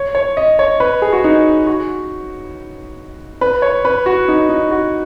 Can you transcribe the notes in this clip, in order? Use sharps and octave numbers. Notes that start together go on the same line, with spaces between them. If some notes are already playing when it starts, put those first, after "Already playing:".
Already playing: C#5
C#5
D#5
C#5
B4
G#4
F#4
D#4
F#4
B4
C#5
B4
F#4
D#4
D#4
F#4